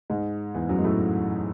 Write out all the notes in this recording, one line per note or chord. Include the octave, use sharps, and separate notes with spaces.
G#2 G#3
E2 E3
F#2 F#3
G#3
A2 A3